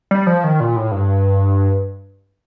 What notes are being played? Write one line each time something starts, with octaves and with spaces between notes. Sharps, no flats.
G3
F3
D#3
A#2
A2
G2